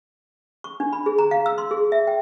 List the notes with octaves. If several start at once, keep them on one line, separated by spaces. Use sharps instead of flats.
C#6
D4
B5
G#4
A#5
F5
E6
C6
G#4
E5
G5